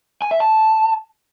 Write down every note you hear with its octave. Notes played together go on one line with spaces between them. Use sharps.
G#5
E5
A5